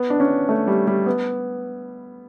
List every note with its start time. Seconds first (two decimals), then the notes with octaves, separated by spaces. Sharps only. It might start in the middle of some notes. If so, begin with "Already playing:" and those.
Already playing: B3
0.10 D4
0.20 C#4
0.49 A3
0.68 G3
0.87 G3
1.06 B3